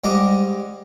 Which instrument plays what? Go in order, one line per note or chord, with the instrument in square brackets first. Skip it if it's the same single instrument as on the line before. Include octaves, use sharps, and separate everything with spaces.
[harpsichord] G#2 G3 D#5 D6 D#6